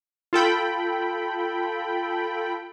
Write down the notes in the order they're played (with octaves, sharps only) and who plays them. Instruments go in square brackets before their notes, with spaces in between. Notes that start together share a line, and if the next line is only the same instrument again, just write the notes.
[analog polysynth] F4 A4 G5 B5